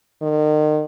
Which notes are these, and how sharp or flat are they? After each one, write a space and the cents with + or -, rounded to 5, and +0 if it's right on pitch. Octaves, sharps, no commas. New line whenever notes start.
D#3 -35